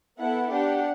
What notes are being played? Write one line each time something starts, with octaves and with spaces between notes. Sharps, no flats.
B3 E4 A4 F#5
D4 G4 F#5